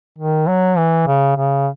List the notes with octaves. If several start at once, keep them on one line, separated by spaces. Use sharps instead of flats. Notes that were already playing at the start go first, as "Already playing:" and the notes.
D#3
F#3
E3
C#3
C#3